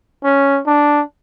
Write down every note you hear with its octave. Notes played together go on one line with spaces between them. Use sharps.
C#4
D4